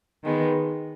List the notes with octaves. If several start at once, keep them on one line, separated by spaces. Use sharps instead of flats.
D#3 G#3 B3